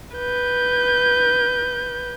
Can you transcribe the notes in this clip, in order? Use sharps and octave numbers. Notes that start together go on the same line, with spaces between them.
B4 G6